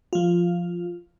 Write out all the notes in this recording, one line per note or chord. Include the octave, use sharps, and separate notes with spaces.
F3 F4